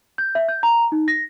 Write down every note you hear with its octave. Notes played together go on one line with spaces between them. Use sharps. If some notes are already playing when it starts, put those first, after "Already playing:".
G6
E5
G6
A#5
D#4
A#6